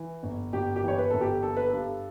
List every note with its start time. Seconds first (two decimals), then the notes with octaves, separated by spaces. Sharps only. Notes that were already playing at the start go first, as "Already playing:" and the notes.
Already playing: E3
0.23 G1
0.53 G1 G4
0.76 G4
0.83 E3 C#5
0.98 B4
1.11 G1 A4
1.21 G4
1.43 G2 A4
1.57 B4
1.69 G2 A4